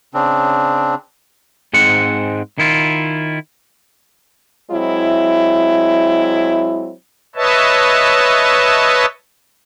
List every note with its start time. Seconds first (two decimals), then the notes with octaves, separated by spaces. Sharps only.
0.14 C#3 C4 D4
1.74 G#2 G#3 C4 F#5
2.58 D#3 E4 F4
4.71 F#3 G#3 C4 E4
7.35 B4 C#5 D#5 E5 A5